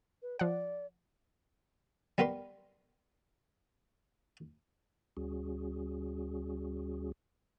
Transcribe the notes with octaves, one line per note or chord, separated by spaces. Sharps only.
B4
F3 D5 F#5
G3 B3 A#4 B4 C6
D2 G3 C#4 F#4 G#4